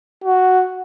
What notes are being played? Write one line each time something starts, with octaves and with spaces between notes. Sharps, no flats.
F#4